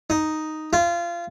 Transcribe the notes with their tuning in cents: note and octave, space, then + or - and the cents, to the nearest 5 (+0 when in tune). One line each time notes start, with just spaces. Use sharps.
D#4 +0
F4 -25